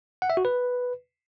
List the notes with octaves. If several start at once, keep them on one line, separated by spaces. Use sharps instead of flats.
F#5
E5
F#4
B4